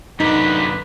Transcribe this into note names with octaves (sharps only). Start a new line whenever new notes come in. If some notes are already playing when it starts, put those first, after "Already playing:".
F#2 D3 D#4 B4 B6